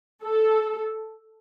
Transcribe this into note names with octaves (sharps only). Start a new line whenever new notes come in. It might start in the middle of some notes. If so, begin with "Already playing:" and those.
A4